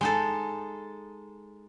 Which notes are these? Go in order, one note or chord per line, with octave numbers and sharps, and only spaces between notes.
G#3 D#4 A4